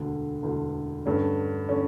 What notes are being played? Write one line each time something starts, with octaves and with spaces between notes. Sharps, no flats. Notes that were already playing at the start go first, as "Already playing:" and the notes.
Already playing: E1 D2 D3
E1 D2 D3
G2 D3 A3 C#4
D3 A3 C#4